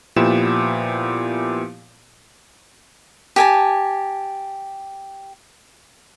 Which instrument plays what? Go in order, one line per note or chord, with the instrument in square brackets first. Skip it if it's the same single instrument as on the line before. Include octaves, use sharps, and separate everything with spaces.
[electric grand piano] A#2 F3 B3 E4 G4 E7
[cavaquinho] G4 G#5 A5